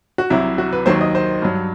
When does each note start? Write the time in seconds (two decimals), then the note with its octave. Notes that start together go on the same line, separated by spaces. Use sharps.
0.18 F#4
0.30 C2 C3 F#3 E4
0.58 F#4
0.73 B4
0.86 D#2 D#3 F#3 C5
1.01 D#5
1.15 C5
1.42 G2 F#3